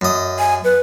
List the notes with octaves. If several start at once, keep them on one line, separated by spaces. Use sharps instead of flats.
F#2 D#5
G#5
B4